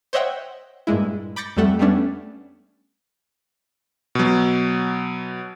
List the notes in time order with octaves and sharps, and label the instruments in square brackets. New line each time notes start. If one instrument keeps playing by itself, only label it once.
[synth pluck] C5 C#5 D#5 E5 F#5 G5
G2 A#2 G#3 E4
B5 D6 G6 A6 A#6 C#7
F2 G3 A3 A4 F#5
G3 A3 B3 C#4 D4
[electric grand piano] B2 F#3